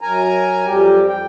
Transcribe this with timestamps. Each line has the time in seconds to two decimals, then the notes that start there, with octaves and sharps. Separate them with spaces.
0.01 F#2 A#4 G#5 A#5
0.66 F2 G3 G4
1.08 G5